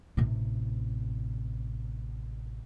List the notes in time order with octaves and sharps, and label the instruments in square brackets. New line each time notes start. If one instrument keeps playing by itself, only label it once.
[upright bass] A1 C3